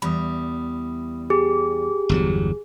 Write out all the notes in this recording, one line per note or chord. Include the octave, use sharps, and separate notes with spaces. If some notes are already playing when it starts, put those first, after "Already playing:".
E2 G3 B5 D#6
G4 G#4
G1 E2 F#3